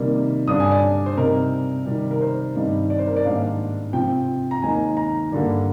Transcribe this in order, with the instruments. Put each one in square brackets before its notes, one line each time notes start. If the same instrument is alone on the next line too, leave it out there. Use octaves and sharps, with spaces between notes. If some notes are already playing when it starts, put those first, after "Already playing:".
Already playing: [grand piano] C3 D#3 G3 A#3
G2 D3 G3 D4 D#6
G#5
D5
C5
C3 G3 C4 D#4 A#4
C3 D#3 G3 C4
A#4
C5
G2 D#3 G3 C4 D#4
D5
C5
A#4
D5
G#2 D#3 G3 A#3 D4 F5
C3 F3 C4 G5
A#5
D#2 D#3 G#3 D#4 G#5
A#5
G2 D3 G3 A#3